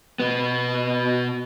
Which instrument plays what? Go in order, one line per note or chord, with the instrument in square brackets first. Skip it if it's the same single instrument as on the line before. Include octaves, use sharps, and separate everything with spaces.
[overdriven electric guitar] B2 B3